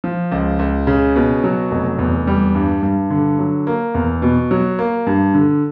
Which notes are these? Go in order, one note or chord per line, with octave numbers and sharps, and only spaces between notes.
F3
C#2
C#2
C#3
B2
F#3
F1
E2
G3
G2
G2
D3
F#3
A#3
E2
B2
F#3
A#3
G2
D3